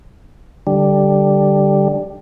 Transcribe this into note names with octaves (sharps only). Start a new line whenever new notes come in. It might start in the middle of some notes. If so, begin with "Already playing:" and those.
D3 G3